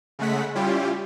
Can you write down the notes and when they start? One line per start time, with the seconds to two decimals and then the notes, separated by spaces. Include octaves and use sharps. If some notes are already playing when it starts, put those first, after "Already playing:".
0.19 C#3 G#3 A3 F#5 B6
0.55 G3 C#4 E4 F4 G4